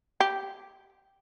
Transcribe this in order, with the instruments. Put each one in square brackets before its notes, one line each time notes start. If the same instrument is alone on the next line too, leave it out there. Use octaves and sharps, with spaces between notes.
[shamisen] G4